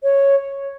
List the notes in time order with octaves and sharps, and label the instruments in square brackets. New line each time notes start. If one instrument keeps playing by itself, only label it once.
[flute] C#5